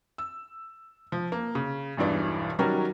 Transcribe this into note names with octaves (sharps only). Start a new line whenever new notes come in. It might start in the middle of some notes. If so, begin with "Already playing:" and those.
E6
F3
A#3
C#3
E1 B1 G2 E3 D5
D#3 F#3 G3 C#4 F#4 A#4